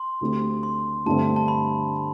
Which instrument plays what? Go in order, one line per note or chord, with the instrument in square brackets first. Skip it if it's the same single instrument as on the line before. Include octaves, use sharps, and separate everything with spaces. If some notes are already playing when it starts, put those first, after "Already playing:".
Already playing: [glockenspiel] C6
[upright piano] D2 D3 A3 C4 G4
[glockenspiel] C6
[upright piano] G2 D3 A3 C4 [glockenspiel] A5
[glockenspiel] A5
B5